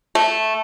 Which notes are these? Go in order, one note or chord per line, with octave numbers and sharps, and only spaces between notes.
A3